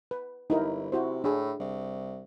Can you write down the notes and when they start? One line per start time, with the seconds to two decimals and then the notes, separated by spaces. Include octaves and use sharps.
0.11 B4
0.50 G1 D#4 E4 A#4
0.92 C3 E4 F#4 C5
1.24 A2 D4 G#4
1.60 C2